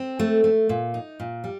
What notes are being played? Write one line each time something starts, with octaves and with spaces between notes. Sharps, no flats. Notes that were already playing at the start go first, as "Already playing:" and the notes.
Already playing: C4
A3
A3
A#2
D#4
A#2
G3